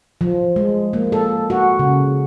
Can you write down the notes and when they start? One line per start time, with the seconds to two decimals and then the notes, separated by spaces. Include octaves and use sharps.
0.21 F3
0.56 G#3
0.93 A#3
1.12 A4
1.50 F#4
1.79 C#3